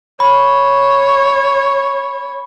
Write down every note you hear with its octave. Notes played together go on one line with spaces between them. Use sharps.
C#5 B5